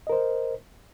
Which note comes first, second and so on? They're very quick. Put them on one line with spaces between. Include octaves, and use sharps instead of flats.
D#5 A#4 C5